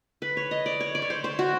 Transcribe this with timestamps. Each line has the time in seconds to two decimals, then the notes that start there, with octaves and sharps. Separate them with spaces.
0.22 B4
0.37 C#5
0.51 D#5
0.66 D5
0.80 C#5
0.95 D5
1.02 C#5
1.10 C5
1.24 C5
1.39 F#4